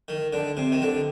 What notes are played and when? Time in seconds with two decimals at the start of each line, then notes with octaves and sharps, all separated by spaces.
0.08 D#3
0.33 D3
0.57 C3
0.72 D#3
0.82 D3